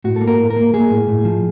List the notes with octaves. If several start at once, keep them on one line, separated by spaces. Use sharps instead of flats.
A2 F#4
A4
A#3
A#4
A2
A#4
A#3
A#3 G#4
A2
A2
F3